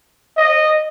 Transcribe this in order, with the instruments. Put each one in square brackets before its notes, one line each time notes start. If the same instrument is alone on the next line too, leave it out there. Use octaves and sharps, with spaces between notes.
[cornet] D#5